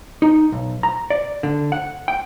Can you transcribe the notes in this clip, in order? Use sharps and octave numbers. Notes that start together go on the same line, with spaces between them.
D#4
B1
A#5
D5
D3
F#5
G5